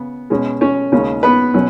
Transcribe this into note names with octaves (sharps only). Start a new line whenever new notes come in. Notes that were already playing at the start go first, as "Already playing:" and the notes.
Already playing: C#3 B3
B2 G#3 C#4
C#4 C#5
D#2 C#3 G#3 C#4
B3 B4
B2 F#3 C#4